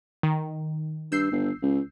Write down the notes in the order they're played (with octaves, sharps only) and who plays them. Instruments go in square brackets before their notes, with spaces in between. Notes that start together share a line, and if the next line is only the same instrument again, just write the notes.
[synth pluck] D#3
[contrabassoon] G2 [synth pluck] E6 G6 C7
[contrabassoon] G1
C#2